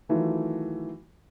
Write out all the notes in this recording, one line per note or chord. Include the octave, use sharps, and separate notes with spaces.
D#3 E3 F#3 A3 F4